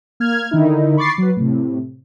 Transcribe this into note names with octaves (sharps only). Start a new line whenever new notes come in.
A#3 F6 G#6
D3 D#3 D#4 E4
B5 C#6 D6 A6 C7
F#3 B4
A2 C3